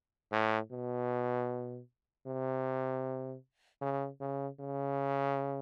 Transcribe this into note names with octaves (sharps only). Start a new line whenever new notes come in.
A2
B2
C3
C#3
C#3
C#3